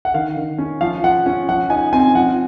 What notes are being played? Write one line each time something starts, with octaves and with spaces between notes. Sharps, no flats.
F#5
D#3 F5
D#3
C#4
F3 F5
F3 F#5
C#4
F3 F#5
D#4 G#5
C4 G#5
F3 F#5